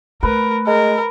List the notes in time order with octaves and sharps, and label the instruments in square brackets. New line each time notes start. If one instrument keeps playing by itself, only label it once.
[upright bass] A3 [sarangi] A#4 [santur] B4
[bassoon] G#3 [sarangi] A#4